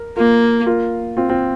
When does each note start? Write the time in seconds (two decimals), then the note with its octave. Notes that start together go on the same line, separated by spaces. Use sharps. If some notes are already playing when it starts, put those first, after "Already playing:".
Already playing: A#4
0.17 A#3 F4 A#4
0.66 F4 A#4
1.17 C4 F4
1.29 C4 F4